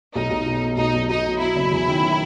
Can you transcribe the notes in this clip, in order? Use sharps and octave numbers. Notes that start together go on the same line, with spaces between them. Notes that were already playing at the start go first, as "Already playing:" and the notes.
B1 D#4
B1
B2
F#3
B1 D#4
B1
B2 D#4
F#3
F#3 E4
F#1
E2
D#3
F#3